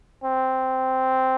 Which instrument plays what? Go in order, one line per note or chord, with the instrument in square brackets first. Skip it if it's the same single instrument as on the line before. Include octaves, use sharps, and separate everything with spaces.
[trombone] C4